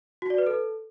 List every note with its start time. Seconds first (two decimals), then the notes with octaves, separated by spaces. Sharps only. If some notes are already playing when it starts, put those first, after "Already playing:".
0.22 F#4
0.30 D5
0.38 B4
0.47 A4